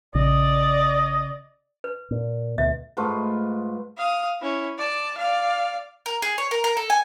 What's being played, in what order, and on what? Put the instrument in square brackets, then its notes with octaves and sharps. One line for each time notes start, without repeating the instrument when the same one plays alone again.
[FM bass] A#1 [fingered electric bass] C#3 [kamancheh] D5 [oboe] D#5
[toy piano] B4
[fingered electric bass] A#2
[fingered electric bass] D2 B2 [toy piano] E5
[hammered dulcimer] G#2 A3 F4 B4
[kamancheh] F5 D#6
C#4 E4
D5 A5
D5 F5
[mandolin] A#4
G#4
C#5
A#4
A#4
A4
G#5